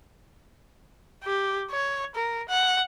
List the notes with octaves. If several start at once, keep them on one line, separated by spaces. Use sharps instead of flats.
G4
C#5
A#4
F#5